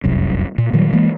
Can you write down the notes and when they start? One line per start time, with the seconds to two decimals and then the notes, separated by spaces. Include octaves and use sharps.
0.04 F1 C2 F#2
0.58 A#2
0.73 A#2 D#3 F#3 G3
0.93 E3 G#3 A#3